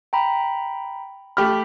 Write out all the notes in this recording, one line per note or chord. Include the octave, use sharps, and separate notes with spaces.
G5 A#5 B5
A3 G4 B5 F6